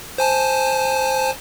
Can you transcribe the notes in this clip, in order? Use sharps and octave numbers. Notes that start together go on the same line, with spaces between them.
C5 G#5 A5